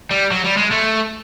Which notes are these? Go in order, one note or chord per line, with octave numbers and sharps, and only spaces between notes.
G3
F#3
G3
G#3
A3